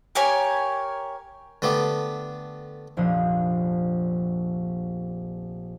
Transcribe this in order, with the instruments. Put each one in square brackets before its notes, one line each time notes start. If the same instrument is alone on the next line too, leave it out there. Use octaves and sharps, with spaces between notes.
[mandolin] G4 A#4 C#5 G#5
[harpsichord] D3 A3 B3 G4
[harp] F1 A#1 F3 D4 D#6